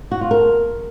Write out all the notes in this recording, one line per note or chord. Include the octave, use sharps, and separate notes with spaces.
F#4
F4
A#4